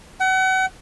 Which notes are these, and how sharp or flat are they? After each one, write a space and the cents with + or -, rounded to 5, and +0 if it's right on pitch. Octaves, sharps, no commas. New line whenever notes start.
F#5 +35